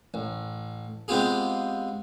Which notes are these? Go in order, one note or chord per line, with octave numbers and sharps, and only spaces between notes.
A1
G#3 B3 C4 F4 G4 G#4